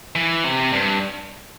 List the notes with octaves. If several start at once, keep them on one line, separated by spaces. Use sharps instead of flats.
E3
C3
G2